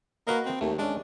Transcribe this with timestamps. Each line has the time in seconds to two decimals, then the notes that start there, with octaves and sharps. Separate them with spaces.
0.27 A#3 F#4 B4 D#5
0.46 C4
0.61 D#2 A3
0.78 G#3 C#4 D4